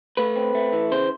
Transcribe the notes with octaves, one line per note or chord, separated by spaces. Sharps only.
A3 B4
C4
A3
E3
C#3 C5